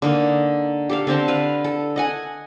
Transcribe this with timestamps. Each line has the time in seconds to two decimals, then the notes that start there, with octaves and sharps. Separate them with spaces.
0.02 D3 A#3 D#4
0.89 G4 A4 F5
1.07 D3 C4 C5 A5
1.28 B4 F5
1.64 A4
1.96 D#5 F#5 G#5